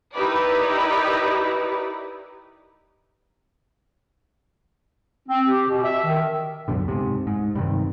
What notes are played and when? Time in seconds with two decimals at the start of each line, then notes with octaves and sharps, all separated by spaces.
0.13 D#4 E4 G4 A#4 B4 D5
5.29 C4
5.47 G4
5.69 B2
5.84 E5
6.05 D#3
6.68 C#2 F#2 B2 D3
6.88 G#2 C3
7.27 G#2
7.55 G2 C3 D#3